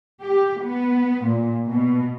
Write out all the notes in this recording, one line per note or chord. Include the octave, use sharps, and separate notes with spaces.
G4
B3
A#2
B2